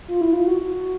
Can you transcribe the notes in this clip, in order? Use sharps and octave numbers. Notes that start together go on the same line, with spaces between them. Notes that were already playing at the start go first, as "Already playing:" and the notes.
F4
E4
F4
F#4